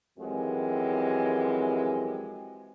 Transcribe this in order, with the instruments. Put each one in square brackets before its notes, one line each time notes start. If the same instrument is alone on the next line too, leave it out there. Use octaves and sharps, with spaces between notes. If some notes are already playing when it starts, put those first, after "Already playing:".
[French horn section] F#2 E3 F3 G#3 C4 G4